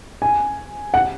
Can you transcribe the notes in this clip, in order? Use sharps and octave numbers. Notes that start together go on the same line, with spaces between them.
G#5
F#5